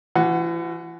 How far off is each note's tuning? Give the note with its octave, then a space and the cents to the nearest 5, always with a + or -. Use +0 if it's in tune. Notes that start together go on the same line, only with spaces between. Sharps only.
E3 +40 F#4 +0 F#5 +0